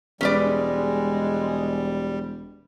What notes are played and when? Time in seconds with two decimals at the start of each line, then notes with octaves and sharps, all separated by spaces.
0.21 E1 G3 G#3 C#4 B4 D5